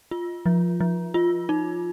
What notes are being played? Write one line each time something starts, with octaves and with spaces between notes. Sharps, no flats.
F4
F3
F3
F4
D#4